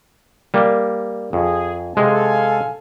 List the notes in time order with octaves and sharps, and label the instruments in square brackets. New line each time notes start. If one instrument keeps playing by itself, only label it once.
[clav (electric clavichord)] G3 A#3
[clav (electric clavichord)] F2 [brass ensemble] G#4
[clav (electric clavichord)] C3 G#3 [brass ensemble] A4 F5 G#5